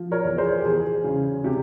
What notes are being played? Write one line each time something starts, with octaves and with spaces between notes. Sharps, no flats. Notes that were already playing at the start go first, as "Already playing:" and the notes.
Already playing: F3
A#4 C#5
E2
G#4 C5
G4
E2 G#4
C#3
C3 G4